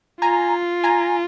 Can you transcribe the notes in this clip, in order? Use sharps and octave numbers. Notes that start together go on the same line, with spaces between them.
F4 G#5 A#5
G#5 A#5